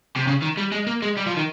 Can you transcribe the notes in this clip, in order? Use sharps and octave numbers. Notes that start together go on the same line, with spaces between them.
C3
C#3
D#3
G3
G#3
A#3
G#3
G3
F3
D#3